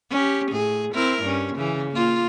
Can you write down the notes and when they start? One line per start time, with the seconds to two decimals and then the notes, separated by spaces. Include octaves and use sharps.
0.11 C#4 G4
0.52 A2 G#4
0.93 C4 E4 A#4
1.22 G2 C#4
1.56 C#3 E3
1.92 A#3 F4